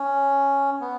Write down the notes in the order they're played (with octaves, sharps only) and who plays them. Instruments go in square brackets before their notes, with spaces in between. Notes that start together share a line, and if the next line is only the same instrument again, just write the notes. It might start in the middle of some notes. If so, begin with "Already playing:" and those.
Already playing: [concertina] C#4
B3